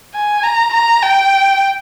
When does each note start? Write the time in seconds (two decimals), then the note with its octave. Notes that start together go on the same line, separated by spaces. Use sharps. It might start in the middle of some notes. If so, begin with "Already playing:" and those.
0.15 G#5
0.44 A#5
0.73 A#5
1.03 G5